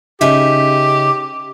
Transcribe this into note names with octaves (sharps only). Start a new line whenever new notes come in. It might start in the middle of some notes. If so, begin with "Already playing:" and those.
C#3 D#4 G4 E5